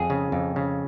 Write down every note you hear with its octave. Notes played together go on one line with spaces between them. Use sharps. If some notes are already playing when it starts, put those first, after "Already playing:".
Already playing: F2 G#4
C#3
F2
C#3